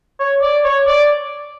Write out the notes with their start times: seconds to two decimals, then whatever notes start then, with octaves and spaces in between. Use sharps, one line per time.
0.20 C#5
0.42 D5
0.64 C#5
0.87 D5